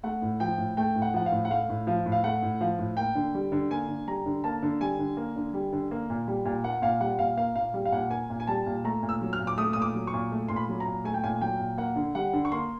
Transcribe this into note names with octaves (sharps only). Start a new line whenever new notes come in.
A3 F#5
A2
F3 G5
A2
A3 G5
A2
F#5
F3 F#5
F5
A2
F#5
A3 F5
A2
F3 F5
A2
F5
A3 F#5
A2
F3 F5
A2
A#3 G5
D3
G3
D3
A#3 G#5
D3
G3 A#5
D3
A#3 A5
D3
G3 G#5
D3
A#3
D3
G3
D3
A#3
A#2
G3
A#2
A#3 F#5
A#2 F5
G3 F#5
A#2 F5
A#3 F5
A#2 F5
G3
F5
A#2 F#5
A#3 G#5
A#2
G#5
G3 A5
A#2
A3 A#5
A#2
E6
F#3
F6
A#2
D6
A3 D#6
A#2 D#6
D6
F#3
C#6
A#2
A3
A#2 C6
B5
F#3
A#5
A#2
A3 G#5
G5
A#2 G#5
F#3 G5
A#2
A#3 F#5
D3
G3 F#5
D3
C#6
A#3 C6